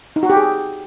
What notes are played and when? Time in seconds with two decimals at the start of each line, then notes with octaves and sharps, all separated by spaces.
0.16 D#4
0.23 F#4
0.30 G4
0.36 G#4